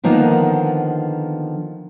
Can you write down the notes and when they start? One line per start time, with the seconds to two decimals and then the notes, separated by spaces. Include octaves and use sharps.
0.04 D3 D#3 F3 A#3 B3